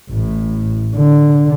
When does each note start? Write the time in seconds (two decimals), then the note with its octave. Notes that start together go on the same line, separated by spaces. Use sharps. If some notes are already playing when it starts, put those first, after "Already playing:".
0.10 A1 A2
0.96 D3